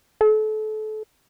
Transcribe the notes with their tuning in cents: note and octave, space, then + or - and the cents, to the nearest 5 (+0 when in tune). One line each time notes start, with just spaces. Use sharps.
A4 -30